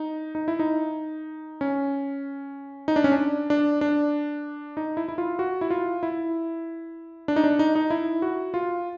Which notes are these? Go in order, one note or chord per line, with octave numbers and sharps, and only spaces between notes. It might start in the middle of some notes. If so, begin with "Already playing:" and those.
Already playing: D#4
D#4
E4
D#4
C#4
D#4
D4
C#4
D4
D4
D4
D#4
E4
E4
F4
F#4
E4
F4
E4
D4
D#4
D4
D#4
D#4
E4
F#4
F4